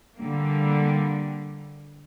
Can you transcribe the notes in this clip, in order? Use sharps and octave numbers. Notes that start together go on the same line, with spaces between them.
D3 G3 A#3